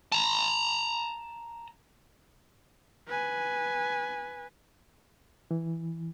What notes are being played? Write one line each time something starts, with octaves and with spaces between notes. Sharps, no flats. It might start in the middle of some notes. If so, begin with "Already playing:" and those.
A5 A#5
B4 G#5
E3